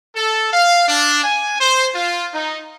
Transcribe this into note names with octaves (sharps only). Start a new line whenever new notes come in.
A4
F5
D4
G#5
C5
F4
D#4